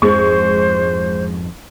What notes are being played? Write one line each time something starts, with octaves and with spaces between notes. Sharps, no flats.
F2 G#2 F3 G#3 C5 C#6